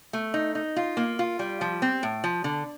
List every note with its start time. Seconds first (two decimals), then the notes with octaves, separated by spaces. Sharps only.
0.13 A3
0.34 D#4
0.55 D#4
0.76 F4
0.97 A#3
1.19 F4
1.39 G3
1.61 F3
1.82 C4
2.03 A2
2.24 F3
2.44 D3